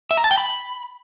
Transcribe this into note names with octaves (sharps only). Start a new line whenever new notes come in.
E5
A#5
A5
G5
B5